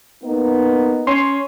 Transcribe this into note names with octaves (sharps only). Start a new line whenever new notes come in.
A#3 B3 D#4
C#4 C6